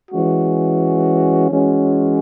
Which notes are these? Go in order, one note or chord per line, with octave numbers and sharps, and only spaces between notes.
E3 G#3 C#4 F#4
E3 G#3 C#4 F#4